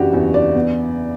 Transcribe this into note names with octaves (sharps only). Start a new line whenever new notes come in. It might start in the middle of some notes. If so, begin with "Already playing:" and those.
Already playing: F#1 C#3 E3 D4 F#4 G4
E2
D5
B3